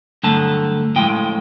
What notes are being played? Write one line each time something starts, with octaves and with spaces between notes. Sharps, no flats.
G2 D3 F#3 A3 A5
A2 F3 G#3 G5